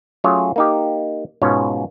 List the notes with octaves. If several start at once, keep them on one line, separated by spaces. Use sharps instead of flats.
F#3 A3 C#4 F4 G#4 C#5
A#3 D#4 G4
G#2 B2 C#4 F4 C#5